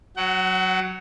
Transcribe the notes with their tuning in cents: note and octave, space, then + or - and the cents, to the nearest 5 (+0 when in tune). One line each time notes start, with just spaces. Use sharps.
F#3 +0 F#5 +30